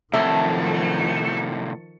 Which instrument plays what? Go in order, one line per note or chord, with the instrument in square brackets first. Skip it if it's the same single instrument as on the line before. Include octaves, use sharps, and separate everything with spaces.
[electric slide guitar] A2 C3 F#3 [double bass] D#3 F3 [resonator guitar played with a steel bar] A3 [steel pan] E5